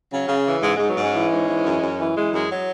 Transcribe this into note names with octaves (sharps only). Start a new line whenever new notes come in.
C#3 F#3
C#3
E3
G#2 G#3
G#2 G#3
F#3 B3
G#2 G#3 C#4
E3
G#2
E3
F#2
F#2
E3
E3 G#3
F#2 G#3
F#3